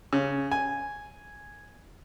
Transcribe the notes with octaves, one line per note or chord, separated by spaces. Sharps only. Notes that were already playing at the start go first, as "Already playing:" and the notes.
C#3
G#5